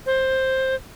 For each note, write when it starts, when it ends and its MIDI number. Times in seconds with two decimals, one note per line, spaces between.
0.06 0.75 72